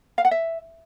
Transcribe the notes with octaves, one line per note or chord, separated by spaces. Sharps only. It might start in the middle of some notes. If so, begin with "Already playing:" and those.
F5
F#5
E5